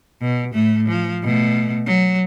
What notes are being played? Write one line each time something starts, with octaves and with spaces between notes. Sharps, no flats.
B2
A2 A3
F3
B2 A3
F#3